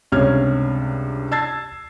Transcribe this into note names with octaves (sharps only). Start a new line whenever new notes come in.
C#2 G2 C3 C#4 F6 G#6
A5 E6 G#6 A6 C7